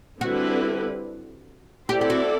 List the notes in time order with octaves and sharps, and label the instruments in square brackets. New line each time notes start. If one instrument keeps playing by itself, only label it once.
[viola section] D3 G3 C4 E4 B4 [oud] F#4
[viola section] C4 E4 A4 D5 [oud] G4
[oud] G4
F#4